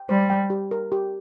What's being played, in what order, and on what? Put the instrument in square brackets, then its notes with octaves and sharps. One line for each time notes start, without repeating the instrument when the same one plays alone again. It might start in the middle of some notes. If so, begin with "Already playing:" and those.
Already playing: [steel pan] G5
[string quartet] G3 [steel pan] C5
[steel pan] G5
G4
A#4
G4